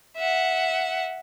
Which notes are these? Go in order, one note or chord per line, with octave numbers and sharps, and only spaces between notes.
E5 F#5